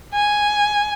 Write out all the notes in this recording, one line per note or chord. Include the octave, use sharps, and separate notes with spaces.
G#5